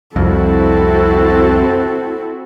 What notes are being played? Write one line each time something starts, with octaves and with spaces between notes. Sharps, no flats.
C2 F2 C4 E4 F#4 A4